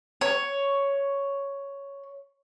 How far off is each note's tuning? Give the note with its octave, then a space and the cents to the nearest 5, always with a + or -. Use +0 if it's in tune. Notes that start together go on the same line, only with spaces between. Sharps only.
C#5 +5